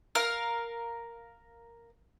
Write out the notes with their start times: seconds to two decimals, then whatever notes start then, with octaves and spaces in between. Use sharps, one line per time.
0.15 A#4 F5